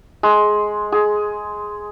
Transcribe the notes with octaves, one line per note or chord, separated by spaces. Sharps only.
G#3
G#4